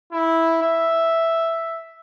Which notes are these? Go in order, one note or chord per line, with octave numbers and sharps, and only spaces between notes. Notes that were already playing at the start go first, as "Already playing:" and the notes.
E4
E5